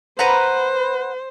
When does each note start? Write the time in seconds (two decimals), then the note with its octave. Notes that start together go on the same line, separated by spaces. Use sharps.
0.19 B4 C5 F#5 A#5